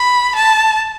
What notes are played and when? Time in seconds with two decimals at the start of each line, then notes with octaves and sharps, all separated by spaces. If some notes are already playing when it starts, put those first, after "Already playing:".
Already playing: B5
0.36 A5